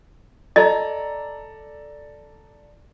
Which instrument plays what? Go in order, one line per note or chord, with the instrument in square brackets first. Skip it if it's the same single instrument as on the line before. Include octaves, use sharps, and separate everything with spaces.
[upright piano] A4 D5 A#5 [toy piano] D#5